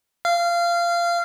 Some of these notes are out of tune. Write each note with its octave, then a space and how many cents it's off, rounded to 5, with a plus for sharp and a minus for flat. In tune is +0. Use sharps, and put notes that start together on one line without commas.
F5 -20